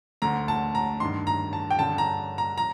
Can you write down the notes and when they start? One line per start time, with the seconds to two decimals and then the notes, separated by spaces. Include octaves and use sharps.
0.22 D2 D3 A#5
0.48 A5
0.75 A#5
1.00 G2 D#3 C6
1.27 A#5
1.53 A5
1.70 G5
1.79 G2 D3 A5
1.98 A#5
2.38 A#5
2.58 A#5